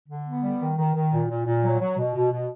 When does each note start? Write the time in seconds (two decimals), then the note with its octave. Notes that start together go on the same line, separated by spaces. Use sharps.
0.09 D3
0.25 B3
0.43 G3
0.60 D#3
0.77 D#3
0.95 D#3
1.12 A#2
1.29 A#2
1.46 A#2
1.63 F#3
1.80 F#3
1.98 B2
2.15 B2
2.32 B2